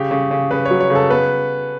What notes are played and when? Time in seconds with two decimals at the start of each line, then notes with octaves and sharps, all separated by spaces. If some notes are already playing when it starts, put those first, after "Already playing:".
Already playing: C#3 G4
0.11 C#3
0.31 C#3
0.51 C#3 B4
0.65 C#5
0.71 F#3
0.80 C#5
0.90 C#3
0.95 A4
1.10 B3 B4